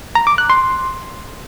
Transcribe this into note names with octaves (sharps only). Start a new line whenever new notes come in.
A#5
D6
F#6
C6